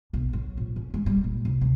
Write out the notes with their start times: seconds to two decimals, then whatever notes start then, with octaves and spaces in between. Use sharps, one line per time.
0.13 B1
0.33 F#3
0.58 A#1
0.76 C#4
0.94 G#3
1.06 G3
1.24 A#2
1.45 C2
1.61 D2